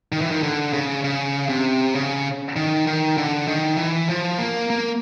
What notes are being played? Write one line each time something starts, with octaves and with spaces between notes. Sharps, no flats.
D#3
E3
D#3
D3
C#3
C#3
C3
C#3
D#3
D#3
D3
D#3
E3
F3
A#3
A#3